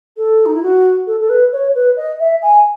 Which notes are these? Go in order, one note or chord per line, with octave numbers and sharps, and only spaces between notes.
A4
D#4
E4
F#4
A4
A4
B4
C#5
B4
D#5
E5
G#5